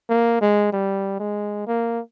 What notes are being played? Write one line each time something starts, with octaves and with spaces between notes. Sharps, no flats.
A#3
G#3
G3
G#3
A#3